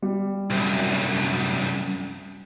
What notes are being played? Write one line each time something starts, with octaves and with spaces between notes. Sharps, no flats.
G3
C2 F#2